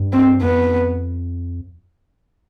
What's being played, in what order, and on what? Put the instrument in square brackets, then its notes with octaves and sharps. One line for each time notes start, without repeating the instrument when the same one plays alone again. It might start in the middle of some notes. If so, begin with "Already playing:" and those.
Already playing: [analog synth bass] G2
[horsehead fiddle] C4
[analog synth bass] F2 [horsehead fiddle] B3